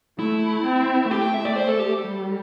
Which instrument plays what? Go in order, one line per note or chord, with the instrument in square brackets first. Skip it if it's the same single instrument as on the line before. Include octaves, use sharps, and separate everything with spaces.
[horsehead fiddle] A3 [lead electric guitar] E4
[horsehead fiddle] C4
[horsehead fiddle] A3 [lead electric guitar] G4
[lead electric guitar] G5
E5
D5
C5
A4
G4
[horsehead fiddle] G3